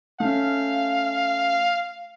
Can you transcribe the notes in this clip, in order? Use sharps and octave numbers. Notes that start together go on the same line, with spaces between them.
A3 C#4 F5